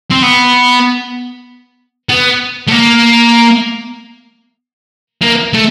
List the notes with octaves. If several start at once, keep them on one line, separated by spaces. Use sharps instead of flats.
C4
B3
B3
A3
A#3
A#3
A3